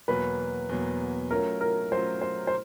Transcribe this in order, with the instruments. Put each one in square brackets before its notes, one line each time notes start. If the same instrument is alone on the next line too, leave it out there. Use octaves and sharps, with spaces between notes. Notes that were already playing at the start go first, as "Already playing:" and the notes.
[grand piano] E2 B2 F#3 A#3 [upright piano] B4
[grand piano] E2 B2 F#3 A#3
[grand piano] F#3 A3 C#4 F4 [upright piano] A#4
[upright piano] A#4
[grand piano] F#3 A3 C#4 F4 [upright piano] C5
[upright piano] C5
C5